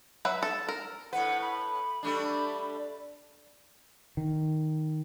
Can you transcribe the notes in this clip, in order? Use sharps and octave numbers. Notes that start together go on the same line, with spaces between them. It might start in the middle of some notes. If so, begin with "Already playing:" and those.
F#3 B4 E5
A4
A#4
A2 B4 F#5
B5
G3 A3 D4
D#3